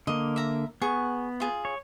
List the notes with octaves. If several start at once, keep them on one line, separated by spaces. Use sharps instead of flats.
D3 A#3 D#5
E5 A#5
B3 G#4 C#6
F4 G#4
C#5